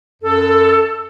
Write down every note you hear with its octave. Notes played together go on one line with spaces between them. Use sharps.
F#2 A4